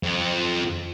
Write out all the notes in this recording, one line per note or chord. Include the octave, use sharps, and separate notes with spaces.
F2